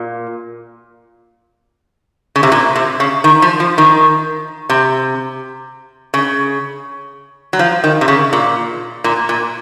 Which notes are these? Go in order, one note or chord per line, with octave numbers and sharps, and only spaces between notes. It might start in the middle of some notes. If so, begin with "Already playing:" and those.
Already playing: A#2
C#3
C3
A#2
C3
C#3
D#3
F3
F3
D#3
C3
C#3
F#3
F3
D#3
C3
C#3
A#2
A#2
A#2